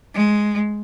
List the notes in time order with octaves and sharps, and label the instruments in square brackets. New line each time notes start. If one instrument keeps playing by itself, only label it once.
[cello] G#3